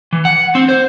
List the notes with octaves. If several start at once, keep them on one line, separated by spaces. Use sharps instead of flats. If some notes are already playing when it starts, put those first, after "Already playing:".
E3
F#5
C4
C5